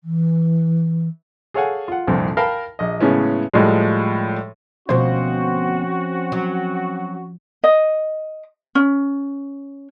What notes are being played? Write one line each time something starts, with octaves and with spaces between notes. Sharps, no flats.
E3
G#4 A4 C#5 F5 F#5 G#5
F4 F#5
C2 F2 A#2 D3 F3 C4
A#4 F5 G5 A5 B5
A#1 D#5
A2 C#3 E3 G#3 B3 C#4
A2 F3 G3 G#3
D2 B2 F3 C4 C#4 F#4 C5
F#3
D#5
C#4